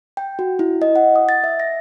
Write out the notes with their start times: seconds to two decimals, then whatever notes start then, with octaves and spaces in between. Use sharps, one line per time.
0.17 G5
0.39 F#4
0.59 E4
0.82 D#5
0.96 F#5
1.16 D#6
1.29 A6
1.44 E5
1.60 A#6